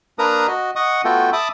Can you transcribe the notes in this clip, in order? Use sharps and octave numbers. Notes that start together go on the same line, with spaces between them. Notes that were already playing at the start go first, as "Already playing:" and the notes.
A#3 D4 A#4 B4 A#5 D#6
F#4 D#5
D#5 F#5 C#6 D#6
A3 B3 F4 F#4 A4 G5
E5 A5 B5 D6 D#6